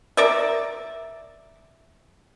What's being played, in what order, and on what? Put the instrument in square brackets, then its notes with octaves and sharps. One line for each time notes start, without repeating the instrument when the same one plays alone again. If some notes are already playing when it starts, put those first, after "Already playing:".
[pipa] A#4 D5 E5